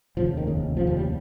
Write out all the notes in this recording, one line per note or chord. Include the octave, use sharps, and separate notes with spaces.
F1 D#2 C#3 F3
D#3
F1 D#2 C#3
F1 D#2 C#3 F3
F3
G3